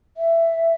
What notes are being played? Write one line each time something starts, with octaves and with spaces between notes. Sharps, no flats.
E5